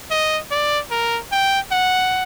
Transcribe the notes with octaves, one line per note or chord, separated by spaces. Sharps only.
D#5
D5
A#4
G5
F#5